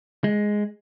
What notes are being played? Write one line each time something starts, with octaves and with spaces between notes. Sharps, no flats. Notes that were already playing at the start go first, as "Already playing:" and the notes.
G#3